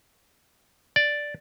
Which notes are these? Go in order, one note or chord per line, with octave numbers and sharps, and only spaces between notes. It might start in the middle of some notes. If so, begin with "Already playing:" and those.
D5